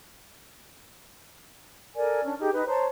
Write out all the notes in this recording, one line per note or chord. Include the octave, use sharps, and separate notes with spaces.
A4 A#4 D5 G#5
C#4 D4
D#4 G4 G#4
D#4 B4 D#5
C5 C#5 A5 A#5